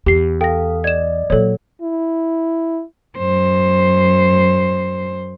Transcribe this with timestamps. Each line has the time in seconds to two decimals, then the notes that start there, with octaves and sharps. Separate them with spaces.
0.06 E2 G4 C7
0.41 A4 F5 G5 A#6
0.84 D5 D#5 G#6 E7
1.30 A#2 F#3 A4 C#5
1.82 E4
3.17 F#2 C5